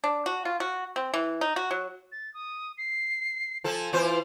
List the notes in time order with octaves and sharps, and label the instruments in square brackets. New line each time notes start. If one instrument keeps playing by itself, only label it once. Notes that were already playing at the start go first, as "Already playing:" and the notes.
[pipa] D4
F#4
F4
F#4
C4
E3
D#4
F#4
F#3
[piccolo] A6
D#6
C7
[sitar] F3 A4 [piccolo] G#5
[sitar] E3 F4 C5